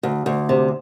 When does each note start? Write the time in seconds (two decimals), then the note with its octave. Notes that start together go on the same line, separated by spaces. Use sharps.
0.03 D2
0.26 D2
0.49 C3